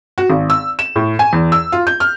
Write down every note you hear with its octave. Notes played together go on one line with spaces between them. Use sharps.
F#4
G#1
E6
E7
A2
G#5
E2
E6
F4
G6
F6